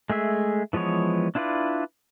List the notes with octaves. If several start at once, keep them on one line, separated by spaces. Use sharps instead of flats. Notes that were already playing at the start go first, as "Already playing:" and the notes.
G#3 A3 G#4 E5
E3 F3 G#3 B3 C#5
D4 E4 F4 B4 D5